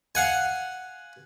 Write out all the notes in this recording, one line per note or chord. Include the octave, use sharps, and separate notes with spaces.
F5 F#5 G#5